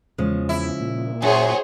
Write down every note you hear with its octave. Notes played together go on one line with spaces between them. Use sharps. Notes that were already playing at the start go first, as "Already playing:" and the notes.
E2 C#3 F3 G#3
E4
A#2
F#2 G#4 C5 C#5